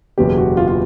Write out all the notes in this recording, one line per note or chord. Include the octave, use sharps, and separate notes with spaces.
F#1 E2 B2 F#3 B3 G4
F#4
F4
F4